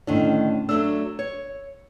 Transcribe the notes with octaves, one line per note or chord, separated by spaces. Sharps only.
A2 D3 D#3 C#4 D4
F#3 A3 D4 E6
C#5